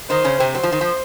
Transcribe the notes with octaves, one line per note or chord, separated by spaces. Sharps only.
D#3 D#4 C5
C#3 C#4
C3 C4
F#3 C5
F3
D#3
F3